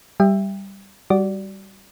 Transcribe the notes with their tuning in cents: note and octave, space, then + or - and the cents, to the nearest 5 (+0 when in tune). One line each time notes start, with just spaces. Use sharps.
G3 +0 E5 +10 G5 +30
G3 +0 F#4 +20 D5 -10